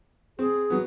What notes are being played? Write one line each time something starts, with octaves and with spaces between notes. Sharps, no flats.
C4 G#4
F#3 B3